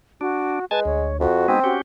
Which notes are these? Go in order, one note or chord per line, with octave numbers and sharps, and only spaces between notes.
D4 F#4
G#3 B4 G#5 A5
D2 C#5
F2 F#4
G#3 B3 C4 D#4
C#4 F#4 G4